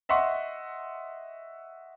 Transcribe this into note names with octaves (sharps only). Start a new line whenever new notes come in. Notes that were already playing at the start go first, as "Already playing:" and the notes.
D#5 E5 F#5 C6 C#6